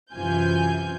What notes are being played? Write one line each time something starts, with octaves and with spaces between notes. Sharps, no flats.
F#2 C3 E3 F4 G#5 G6